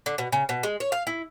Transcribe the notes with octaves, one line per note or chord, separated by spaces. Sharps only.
D3
B2
C#3
B2
G#3
C#5
F5
E4